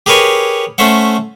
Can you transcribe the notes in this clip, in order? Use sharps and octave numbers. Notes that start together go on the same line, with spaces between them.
G4 G#4 A#4 B4 C#5 G#5
A3 C#4 C5 E5 F#5